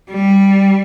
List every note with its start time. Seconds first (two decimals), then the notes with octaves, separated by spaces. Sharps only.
0.11 G3